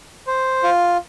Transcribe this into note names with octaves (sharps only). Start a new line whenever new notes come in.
C5
F4